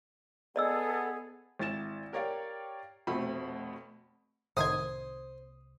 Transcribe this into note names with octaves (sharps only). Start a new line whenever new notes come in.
B3 G#4 A4 D5 D#5 E6
G#1 E4 A6 E7
G4 A#4 C#5 D5 F5 G5
F1 B2 A3 C4 B5
C2 A2 D#3 C5 D#6 G#6